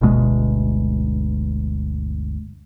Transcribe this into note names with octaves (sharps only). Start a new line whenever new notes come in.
G1 D2 B2 G#3